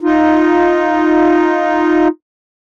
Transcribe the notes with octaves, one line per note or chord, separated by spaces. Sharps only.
D#4 F4